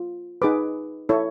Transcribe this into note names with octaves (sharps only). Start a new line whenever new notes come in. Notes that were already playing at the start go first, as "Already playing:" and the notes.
Already playing: F4
D#4 G#4 B4 D6
E4 A4 C#5